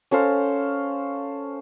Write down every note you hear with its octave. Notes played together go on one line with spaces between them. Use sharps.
C#4 A4 C5 F5